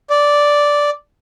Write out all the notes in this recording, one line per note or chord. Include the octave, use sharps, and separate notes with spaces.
D5